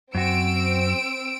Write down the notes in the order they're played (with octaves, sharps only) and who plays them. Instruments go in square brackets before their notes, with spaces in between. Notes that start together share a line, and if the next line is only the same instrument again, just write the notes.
[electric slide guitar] F#2 F#4 [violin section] C4 E6 D7